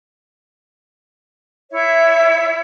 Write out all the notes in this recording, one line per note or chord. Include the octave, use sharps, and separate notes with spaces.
E4 C#5 E5